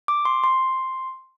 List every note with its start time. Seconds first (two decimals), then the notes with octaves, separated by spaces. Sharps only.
0.08 D6
0.25 C6
0.44 C6